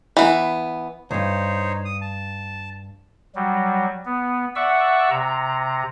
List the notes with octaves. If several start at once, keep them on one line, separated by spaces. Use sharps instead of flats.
E3 B3
C#2 G2 D#4 C5 C#5
D#6
A5
F#3 G3
B3
D5 E5 F#5 C#6 E6
C3 A#5